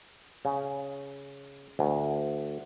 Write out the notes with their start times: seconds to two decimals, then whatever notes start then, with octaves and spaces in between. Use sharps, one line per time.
0.45 C#3
1.79 D2